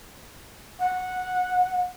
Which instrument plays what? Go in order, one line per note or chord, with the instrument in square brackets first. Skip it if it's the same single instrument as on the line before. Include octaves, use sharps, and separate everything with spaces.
[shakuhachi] F#5